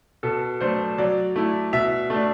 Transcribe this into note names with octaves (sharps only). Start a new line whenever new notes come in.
B2 A4
F#3 A3 D4 C5
F#3 D5
A3 E4
B2 E5
A3 D4